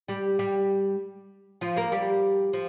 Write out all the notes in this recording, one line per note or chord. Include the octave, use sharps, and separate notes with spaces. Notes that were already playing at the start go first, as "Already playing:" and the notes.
G3 G4
G3 G4
F3 F4
A#3 A#4
G3 G4
F3